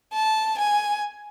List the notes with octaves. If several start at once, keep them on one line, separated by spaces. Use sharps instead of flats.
A5
G#5